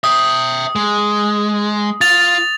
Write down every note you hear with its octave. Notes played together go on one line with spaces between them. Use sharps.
E5 G5 D#6
G#3
F4 A6 F7